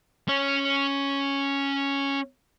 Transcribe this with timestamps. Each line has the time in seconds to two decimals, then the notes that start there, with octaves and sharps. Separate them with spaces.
0.28 C#4 C#5